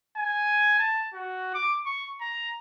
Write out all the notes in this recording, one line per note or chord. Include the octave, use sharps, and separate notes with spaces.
G#5
A5
F#4
D6
C#6
A#5